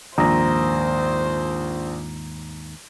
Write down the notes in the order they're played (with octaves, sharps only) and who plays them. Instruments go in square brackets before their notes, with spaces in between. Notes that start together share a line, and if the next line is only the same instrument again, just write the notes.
[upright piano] A#1 [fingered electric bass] D#2 G#2 [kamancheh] C5 [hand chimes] A#5 A#6